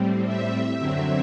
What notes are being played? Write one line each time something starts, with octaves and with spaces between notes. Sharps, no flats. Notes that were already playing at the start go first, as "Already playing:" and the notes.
Already playing: A2 G3 C4
E5
F#2 D3 F#3 C4